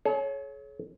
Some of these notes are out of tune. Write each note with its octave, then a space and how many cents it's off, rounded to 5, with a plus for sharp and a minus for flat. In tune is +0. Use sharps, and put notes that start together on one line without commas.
G#4 +45 C#5 +0